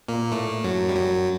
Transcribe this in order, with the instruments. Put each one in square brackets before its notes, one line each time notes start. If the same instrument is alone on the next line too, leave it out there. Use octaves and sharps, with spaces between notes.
[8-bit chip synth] A#2 A#3
A2 A3
F#2 F#3
G3
F#2 F#3